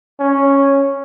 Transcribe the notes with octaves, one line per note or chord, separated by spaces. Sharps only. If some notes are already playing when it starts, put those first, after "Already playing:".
C#4